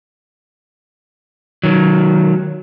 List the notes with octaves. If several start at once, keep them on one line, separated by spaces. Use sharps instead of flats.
D#3 F#3